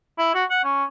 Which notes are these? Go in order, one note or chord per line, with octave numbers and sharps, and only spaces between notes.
E4
F#4
F#5
C#4